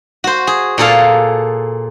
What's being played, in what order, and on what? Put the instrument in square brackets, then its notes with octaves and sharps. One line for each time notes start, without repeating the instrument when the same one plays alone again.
[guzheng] F#4 C5
G#4
A#2 G#4 A4 F5